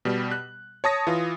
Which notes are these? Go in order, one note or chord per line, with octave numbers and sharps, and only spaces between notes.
B2 G3
F#6
C#5 A5 D#6 A#6
E3 F4